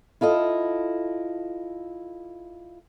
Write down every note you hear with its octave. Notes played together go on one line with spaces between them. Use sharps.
E4 F4 A4 D#5